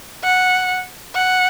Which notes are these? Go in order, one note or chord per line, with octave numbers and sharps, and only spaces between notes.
F#5
F#5